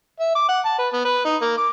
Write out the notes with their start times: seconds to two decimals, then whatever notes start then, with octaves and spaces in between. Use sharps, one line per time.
0.20 E5
0.35 D6
0.49 F#5
0.65 A5
0.79 B4
0.93 B3
1.05 B4
1.24 D#4
1.41 A#3
1.57 D6